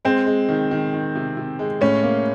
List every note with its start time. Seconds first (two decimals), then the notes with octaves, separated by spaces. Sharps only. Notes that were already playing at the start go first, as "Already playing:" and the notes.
0.05 G#3 C4
0.26 G#3
0.49 D#3
0.71 D#3
0.93 D#3
1.15 C3
1.37 C3
1.59 G#3
1.81 A2 C#4
2.03 A#3